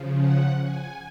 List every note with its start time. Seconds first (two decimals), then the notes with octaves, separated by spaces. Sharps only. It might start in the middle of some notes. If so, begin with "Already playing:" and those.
Already playing: C#3 F3
0.19 F#5
0.61 G#5